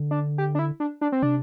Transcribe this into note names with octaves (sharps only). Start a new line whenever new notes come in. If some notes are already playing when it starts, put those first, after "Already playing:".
Already playing: D3
D4
G4
D4
E4
D4
D4
C4
C3 D4